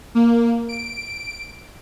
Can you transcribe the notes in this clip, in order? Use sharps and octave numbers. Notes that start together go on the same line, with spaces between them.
A#3
D7